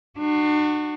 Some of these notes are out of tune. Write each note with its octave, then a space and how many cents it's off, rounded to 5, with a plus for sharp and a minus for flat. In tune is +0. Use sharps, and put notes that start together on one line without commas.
D4 +40 F#4 +0